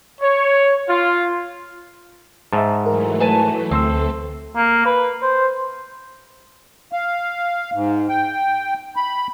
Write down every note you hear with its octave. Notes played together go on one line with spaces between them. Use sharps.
C#5
F4
G#2 E5 A5
E3 F#3 A3 A#4
B4 G#5 A5
D2 A3 C4 A4 C6 E6
A#3
B4
C5
F5
G#2
G5
B5